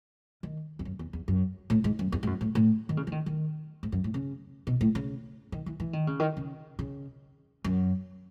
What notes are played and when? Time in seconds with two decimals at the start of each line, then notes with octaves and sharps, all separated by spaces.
0.43 D#3
0.79 E2
0.85 F#2
0.99 E2
1.13 E2
1.28 F#2
1.70 A2
1.84 G#2
1.99 F#2
2.12 E2
2.23 G#2
2.27 F#2
2.41 A2
2.55 A2
2.89 D#3
2.97 C#3
3.07 E3
3.12 D#3
3.26 D#3
3.83 G#2
3.92 F#2
4.04 A2
4.14 C#3
4.67 B2
4.81 A2
4.95 C#3
5.52 D#3
5.66 E3
5.80 E3
5.93 D#3
6.07 C#3
6.19 D#3
6.37 C#3
6.79 C#3
7.64 F#2